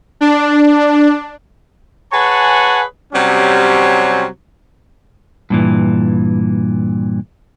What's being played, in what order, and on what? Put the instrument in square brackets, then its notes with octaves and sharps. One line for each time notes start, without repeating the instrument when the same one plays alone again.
[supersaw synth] D4
[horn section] G#4 B4 C#5 F#5 G#5 A5
C3 F#3 G3 C4 C#4
[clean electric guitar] G2 A#2 E3